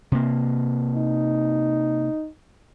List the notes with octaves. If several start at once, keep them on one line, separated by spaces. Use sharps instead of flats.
C3 A#3
D#4